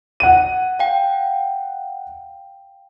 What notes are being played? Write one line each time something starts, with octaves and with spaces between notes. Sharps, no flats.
F#5 D#7
F5 G5